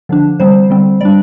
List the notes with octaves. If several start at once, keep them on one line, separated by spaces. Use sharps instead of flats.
D3 F3 D4
D3 G3 C4 C5
D3 G3 C4
G3 D4 D5